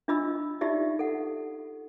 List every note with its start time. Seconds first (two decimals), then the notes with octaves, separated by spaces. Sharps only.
0.08 D4 F4 D#5 B5 E6
0.61 D#4 F4 G4 D5 E5
0.99 A4 F#5